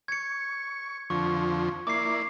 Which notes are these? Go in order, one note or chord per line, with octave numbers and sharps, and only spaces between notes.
C#6 G#6 C#7
F2 D3 F3 C#6
A#3 E4 D5 D6 C7